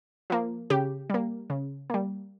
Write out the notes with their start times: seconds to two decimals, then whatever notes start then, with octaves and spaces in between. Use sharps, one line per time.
0.30 F3 A#3
0.70 C#3 G4
1.10 G3 A#3
1.50 C#3
1.90 G3 A#3